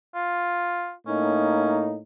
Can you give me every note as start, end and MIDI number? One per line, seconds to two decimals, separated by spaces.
0.15 0.92 65
1.07 1.99 45
1.07 1.99 58
1.07 1.85 61
1.07 1.99 63